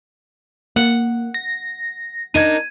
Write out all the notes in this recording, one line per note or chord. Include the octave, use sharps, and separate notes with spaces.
A#3 F#5
A#6
D4 D#4 A#4 G#6 D#7